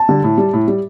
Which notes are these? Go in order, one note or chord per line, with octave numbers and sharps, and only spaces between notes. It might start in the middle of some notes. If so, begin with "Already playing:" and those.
Already playing: A5
D3 G3
A2
G3
A2
G3